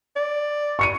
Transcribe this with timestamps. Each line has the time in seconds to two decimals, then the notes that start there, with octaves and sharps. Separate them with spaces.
0.16 D5
0.79 C#6 C#7 D#7